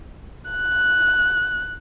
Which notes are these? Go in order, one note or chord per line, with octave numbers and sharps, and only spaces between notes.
F#6